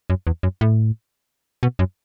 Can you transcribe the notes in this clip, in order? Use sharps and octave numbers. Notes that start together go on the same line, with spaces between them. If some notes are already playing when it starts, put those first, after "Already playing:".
F#2
E2
F#2
A2
B2
F#2